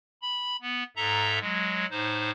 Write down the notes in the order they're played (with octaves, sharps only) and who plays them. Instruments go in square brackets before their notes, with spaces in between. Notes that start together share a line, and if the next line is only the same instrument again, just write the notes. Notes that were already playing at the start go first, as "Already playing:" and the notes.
[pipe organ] B5
B3
G#2 A4 E5 A#5
F#3 G#3
A2 D#4 C5